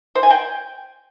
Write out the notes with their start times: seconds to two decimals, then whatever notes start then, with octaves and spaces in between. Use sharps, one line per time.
0.15 C5
0.23 G#5
0.30 G5